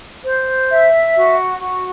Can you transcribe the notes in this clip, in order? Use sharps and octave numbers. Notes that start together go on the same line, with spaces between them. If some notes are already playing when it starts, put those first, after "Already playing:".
C5
E5
F#4
F#4